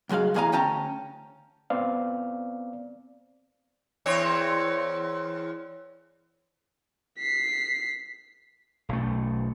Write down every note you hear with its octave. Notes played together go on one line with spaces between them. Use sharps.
C#2 F#2 G#3 F#4 F5
E2 A2 G#4 F5 G#5 A#5
D2 C#4 G5 A5 A#5
B3 C4 D5 F5
E2 C4 C#5
B6 C7
B1 A3